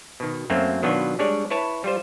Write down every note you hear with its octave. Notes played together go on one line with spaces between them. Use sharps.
B2 D#3
F#2 F#3 A3 A#3 C4
B2 D#3 F#3 B3 D4 F4
G3 G#3 D4 C#5 D5
E4 B4 C#5 A5
G3 F4 C5